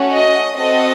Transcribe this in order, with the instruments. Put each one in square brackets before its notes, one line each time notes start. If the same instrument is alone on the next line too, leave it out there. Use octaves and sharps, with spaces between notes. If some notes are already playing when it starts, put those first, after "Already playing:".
Already playing: [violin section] A3 C#4 F#4
D#5
C4 F#4 A4 D#5